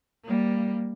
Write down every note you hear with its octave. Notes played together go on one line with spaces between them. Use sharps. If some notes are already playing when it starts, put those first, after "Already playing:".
G3 A#3